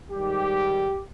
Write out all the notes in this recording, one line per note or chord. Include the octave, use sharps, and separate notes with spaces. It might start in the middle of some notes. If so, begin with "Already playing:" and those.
G#2 D#3 G3 G4